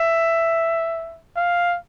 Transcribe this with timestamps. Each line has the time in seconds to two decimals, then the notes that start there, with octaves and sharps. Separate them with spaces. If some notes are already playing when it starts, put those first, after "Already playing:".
Already playing: E5
1.37 F5